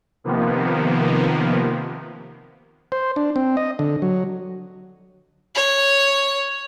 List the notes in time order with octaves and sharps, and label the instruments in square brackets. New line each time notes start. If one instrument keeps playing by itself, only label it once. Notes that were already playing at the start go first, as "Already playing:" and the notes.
[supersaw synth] C3 D#3 F3 A#3 B3
[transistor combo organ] C5
D4
C4
D#5
D3
F#3
[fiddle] C#5